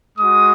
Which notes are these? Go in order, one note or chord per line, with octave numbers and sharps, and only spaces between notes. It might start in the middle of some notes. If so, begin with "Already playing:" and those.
G#3 F#4 D#6